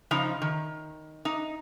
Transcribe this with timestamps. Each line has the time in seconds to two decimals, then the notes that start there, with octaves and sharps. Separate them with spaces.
0.11 C#3 F3 D#4
0.42 D#3
1.25 D#4